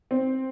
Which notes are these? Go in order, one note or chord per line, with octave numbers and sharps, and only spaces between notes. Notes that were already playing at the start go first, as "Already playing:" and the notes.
C4